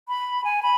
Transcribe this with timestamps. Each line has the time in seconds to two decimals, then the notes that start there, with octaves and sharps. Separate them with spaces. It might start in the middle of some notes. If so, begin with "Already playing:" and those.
0.08 B5
0.44 G#5
0.63 B5